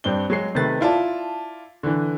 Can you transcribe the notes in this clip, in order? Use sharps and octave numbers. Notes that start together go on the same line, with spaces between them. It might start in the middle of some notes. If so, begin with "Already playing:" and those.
G2 C4 D4 G7
F#3 G#3 C7
C3 D#3 A3 B4 A6
E4 F4 D5 A5
D3 E3